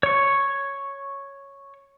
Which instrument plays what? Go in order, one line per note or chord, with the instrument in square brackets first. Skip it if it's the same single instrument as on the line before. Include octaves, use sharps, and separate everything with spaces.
[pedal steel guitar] C#5 C#6